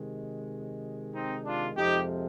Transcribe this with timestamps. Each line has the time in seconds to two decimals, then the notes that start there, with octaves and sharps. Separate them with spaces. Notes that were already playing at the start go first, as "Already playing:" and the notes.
Already playing: C3 D#3 G#3
1.13 C4 D#4
1.44 D4 F4
1.76 F2 C3 F3 G#3 D#4 G4